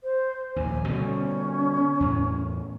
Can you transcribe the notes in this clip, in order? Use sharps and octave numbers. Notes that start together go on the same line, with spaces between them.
C5
A#1 D#2 G#5
B2 D3 G3 C#4
E2 A2